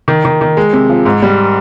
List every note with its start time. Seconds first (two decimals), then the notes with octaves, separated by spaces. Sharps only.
0.08 D#3
0.25 D#3
0.41 D#3
0.57 G#3
0.73 C3
0.89 F3
1.05 G#2
1.22 G3